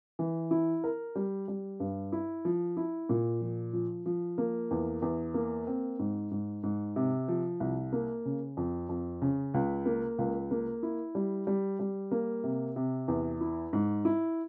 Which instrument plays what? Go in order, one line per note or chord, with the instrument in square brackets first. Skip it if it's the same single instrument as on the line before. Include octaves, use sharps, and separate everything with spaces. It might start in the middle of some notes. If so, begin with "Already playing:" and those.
[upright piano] E3
E4
A#4
G3
G3
G2
E4
F3
E4
A#2
F3
F3
F3
A#3
E2
E2
A#3
C4
G#2
G#2
G#2
C3
F3
C2
A#3
C#3
F2
F2
C#3
C#2
A#3
C#2
A#3
E4
G3
G3
G3
A#3
C3
C3
E2
E4
G#2
E4